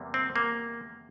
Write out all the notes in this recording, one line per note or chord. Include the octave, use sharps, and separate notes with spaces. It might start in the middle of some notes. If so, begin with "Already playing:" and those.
Already playing: E2 C3 G3 A#3
C4
A#3